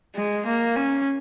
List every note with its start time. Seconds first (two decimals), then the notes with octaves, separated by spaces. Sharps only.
0.15 G#3
0.46 A#3
0.76 C#4